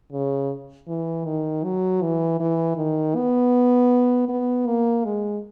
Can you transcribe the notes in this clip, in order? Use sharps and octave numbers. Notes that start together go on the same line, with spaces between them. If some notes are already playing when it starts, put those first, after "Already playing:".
C#3
E3
D#3
F#3
E3
E3
D#3
B3
B3
A#3
G#3